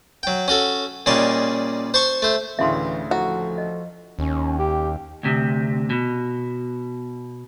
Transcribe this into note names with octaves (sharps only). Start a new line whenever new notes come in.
F#3 G5
C#4 F#4 A4
A#2 C#3 G3 C#5 D#5 A5
C5 A5 C6 C#6
A3 C5
D2 A2 C#3 E3 E5 F5 C6
F3 E4 F#4 A4
D#5
D#2 C#4
G4
D2 C3
B2